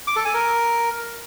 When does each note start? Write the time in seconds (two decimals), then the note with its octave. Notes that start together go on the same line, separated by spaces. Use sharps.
0.07 D6
0.16 A4
0.25 G#5
0.34 A#4